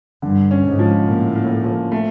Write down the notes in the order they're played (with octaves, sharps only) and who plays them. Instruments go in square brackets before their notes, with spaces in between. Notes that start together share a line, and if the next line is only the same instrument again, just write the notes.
[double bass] G2 [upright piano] D3
[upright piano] C#4
[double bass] G#2
[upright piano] F3
[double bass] A2 [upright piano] A#3
[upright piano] A#3
F3
A3